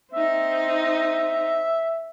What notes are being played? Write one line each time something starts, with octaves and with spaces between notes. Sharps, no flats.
C4 D#4 E5